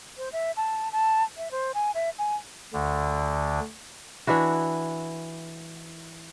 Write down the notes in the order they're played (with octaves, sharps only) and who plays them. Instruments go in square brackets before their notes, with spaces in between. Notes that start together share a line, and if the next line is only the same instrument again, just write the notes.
[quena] C5
E5
A5
A5
E5
C5
G#5
E5
G#5
[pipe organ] D2 D3
[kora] E3 D4 E4 F#4